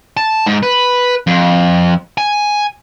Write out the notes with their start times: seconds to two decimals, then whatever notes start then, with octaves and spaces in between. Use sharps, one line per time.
0.17 A5
0.46 G#2
0.63 B4
1.27 F2
2.18 G#5